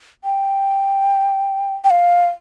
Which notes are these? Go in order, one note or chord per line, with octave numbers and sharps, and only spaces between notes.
G5
G5
F5